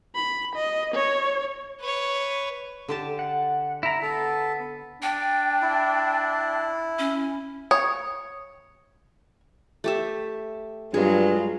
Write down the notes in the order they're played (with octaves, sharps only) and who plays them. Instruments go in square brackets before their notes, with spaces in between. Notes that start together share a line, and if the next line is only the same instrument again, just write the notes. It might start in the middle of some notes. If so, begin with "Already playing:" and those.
[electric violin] B5
D#5
C#5
[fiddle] B4 C#5
[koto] D3 G4 A5
[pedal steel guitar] F#5
E4 A#5
[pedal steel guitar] B3 [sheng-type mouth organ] A4
[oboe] D4 [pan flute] G5
[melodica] E4
[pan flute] C#4
[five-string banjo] C#5 [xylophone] D#6
[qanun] A3 G4 E5
[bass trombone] G2 [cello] F#3 F4 [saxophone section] G#3 [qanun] G#4